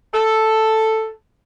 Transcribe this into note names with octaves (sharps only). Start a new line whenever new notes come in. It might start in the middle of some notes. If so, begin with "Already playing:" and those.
A4